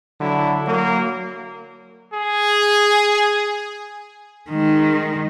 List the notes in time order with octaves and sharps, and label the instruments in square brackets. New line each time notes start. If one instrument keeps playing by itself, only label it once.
[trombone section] D3 F#3 E4
F#3 A#3
[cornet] G#4
[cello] D#3 G#3